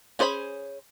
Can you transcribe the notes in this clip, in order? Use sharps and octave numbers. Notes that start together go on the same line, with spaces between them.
C#4 G#4 C5 D5 B5